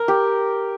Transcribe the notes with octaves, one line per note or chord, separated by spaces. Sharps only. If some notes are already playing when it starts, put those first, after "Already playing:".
Already playing: A#4
G4